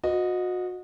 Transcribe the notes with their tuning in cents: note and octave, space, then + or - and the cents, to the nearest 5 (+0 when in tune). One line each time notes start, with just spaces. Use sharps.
F#4 -30 B4 +25 D#5 -5